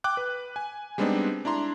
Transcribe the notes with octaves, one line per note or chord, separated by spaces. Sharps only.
G5 D6 F#6
B4
G#5
G3 G#3 B3 C4 D4 D#4
D4 E4 A#5 C6